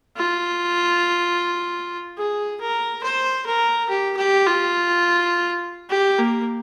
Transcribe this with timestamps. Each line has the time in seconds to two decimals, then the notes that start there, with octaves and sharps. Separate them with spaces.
0.17 F4
2.18 G#4
2.60 A#4
3.04 C5
3.46 A#4
3.89 G4
4.17 G4
4.46 F4
5.90 G4
6.19 A#3